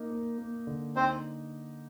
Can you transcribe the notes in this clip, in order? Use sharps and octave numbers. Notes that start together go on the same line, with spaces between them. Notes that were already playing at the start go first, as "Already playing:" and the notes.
Already playing: A#3 D#4
A#3
A#3
D3
C4 D#4 C5